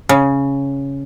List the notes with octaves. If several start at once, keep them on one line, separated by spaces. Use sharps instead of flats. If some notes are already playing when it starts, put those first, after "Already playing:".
C#3